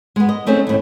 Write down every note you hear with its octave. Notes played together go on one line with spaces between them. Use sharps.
G#3 B3
D#5
A3 C4 C#4 D#4 G#4
D#2 A2